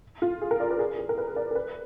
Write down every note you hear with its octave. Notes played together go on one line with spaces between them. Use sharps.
F4
G#4
A#4
D5
B4
G#4
G#4
A#4
B4
D5
A#4
B4